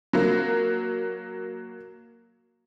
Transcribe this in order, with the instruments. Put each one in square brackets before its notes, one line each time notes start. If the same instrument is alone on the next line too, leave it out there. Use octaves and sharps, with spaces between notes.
[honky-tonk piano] F#3 A#3